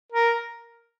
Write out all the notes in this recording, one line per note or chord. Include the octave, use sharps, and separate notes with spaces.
A#4